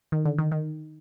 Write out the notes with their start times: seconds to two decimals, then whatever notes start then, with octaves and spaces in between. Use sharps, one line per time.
0.12 D#3
0.25 D3
0.38 D#3
0.52 D#3